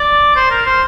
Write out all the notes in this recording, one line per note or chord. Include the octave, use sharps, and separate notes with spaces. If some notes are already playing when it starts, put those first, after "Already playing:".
Already playing: D5
C5
A#4
C5